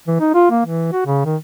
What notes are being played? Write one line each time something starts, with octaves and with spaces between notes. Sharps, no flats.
E3
D#4
F4
A#3
E3
F#4
C#3
D#3